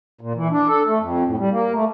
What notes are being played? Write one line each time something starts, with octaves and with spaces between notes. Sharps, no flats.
A#2
E3
D4
A4
A3
F2
A2
G3
A#3
A3